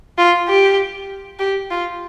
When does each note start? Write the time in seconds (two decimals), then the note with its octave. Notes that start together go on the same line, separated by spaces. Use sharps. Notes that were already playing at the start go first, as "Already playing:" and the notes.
0.18 F4
0.49 G4
1.39 G4
1.71 F4